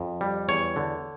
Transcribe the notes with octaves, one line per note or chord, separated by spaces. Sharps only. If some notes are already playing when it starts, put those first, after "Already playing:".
Already playing: F2
G3
E2 C#5
D3